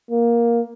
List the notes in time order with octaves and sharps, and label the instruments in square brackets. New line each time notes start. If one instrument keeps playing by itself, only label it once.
[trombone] A#3